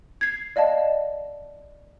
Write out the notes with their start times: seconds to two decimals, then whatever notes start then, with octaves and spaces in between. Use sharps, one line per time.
0.21 G#6 C7
0.56 D5 D#5 F5 A5